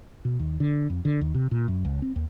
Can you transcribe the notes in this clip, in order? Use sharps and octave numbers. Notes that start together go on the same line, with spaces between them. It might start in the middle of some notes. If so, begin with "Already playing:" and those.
B2
D#2
D3
F2
D3
D#2
C3
A#2
F#2
C#2
C4
D#2